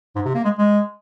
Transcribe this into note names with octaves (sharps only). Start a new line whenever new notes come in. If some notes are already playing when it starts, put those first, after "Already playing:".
G#2
C3
A#3
G#3
G#3